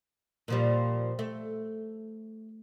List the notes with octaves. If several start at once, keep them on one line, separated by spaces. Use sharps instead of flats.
A#2 F3 G3
A3